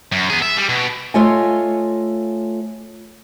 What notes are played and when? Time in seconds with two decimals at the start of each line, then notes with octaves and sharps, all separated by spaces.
0.12 F#2
0.30 B3 G#4
0.42 E5
0.57 G3
0.69 B2
1.14 A3 F4 C#5 D#5 G#5